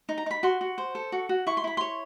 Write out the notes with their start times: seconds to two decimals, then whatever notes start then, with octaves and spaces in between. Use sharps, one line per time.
0.09 D#4
0.18 A#5
0.26 D#4 B5
0.43 F#4 C6
0.61 F#4
0.78 C5
0.95 A4
1.12 F#4
1.29 F#4
1.47 E4 C#6
1.57 C6
1.64 E4 B5
1.77 C#5 C6